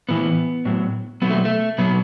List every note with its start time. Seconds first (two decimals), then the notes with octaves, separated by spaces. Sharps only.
0.09 A2 E3 B3
0.65 A2 F#3
1.22 B2 F#3 B3
1.30 A3
1.45 A3
1.78 B2 F#3 B3